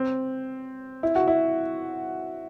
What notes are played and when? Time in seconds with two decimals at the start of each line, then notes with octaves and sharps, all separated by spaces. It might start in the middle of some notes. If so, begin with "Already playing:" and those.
Already playing: C4
1.03 E4
1.15 F#4
1.28 E4